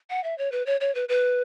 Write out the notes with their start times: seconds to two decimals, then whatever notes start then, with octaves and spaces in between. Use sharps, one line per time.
0.10 F#5
0.24 E5
0.38 C#5
0.52 B4
0.66 C#5
0.81 C#5
0.95 B4
1.09 B4